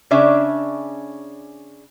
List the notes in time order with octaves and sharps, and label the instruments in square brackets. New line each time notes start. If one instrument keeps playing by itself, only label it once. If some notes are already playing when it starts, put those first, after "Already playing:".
[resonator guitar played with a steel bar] C#3 C#4 D4 E5